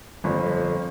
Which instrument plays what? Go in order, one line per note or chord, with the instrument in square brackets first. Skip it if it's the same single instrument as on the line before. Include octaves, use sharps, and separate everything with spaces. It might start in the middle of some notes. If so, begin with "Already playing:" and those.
[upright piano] G1 [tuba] F2